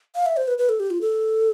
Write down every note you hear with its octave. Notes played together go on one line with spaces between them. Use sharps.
F5
E5
C5
B4
B4
A4
G4
F4
A4